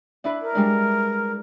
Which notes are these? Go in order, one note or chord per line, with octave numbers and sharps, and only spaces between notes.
D4 E4 B4
A#4
G3 G#3 D4